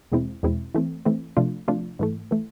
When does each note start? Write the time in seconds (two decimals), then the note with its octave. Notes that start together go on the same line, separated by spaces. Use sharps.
0.12 E2 B2 G#3 C4 E4
0.43 E2 B2 G#3 C4 E4
0.75 E3 A3 C4
1.05 E3 A3 C4
1.37 C3 F3 A3 D4 F4
1.68 C3 F3 A3 D4 F4
1.99 G#2 E3 A3
2.31 E3 A3